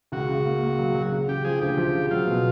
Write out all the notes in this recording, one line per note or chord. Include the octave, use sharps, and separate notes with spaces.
C#2 F#4
C#3
A#3
A#3
F#3
F#3
C#3
C#3 G4
F3 G#4
D2 G4
F3
C#3
F#3 F4
B2